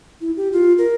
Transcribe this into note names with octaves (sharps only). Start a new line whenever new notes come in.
E4
G4
F4
A#4